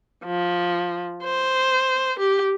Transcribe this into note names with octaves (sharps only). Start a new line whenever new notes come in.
F3
C5
G4